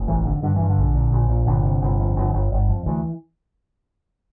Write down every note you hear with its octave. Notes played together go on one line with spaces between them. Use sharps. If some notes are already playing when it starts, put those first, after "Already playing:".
Already playing: F1
A1 E3
D3
G2 D3
G2 E3
D3
A#1
A#2
A#1
A#2
G1 D3
C3
G1
F2
G1
G1
G1
F2
D2 E3